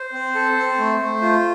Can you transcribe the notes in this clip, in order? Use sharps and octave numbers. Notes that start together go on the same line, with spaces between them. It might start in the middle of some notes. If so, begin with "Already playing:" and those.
Already playing: C5
C4
A4
C4
A3
A3
F4